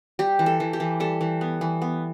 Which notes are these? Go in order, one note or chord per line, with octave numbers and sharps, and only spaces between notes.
G3 G4
E3
A4
E3
G4
E3
G3 A4
E3
B3
E3
B3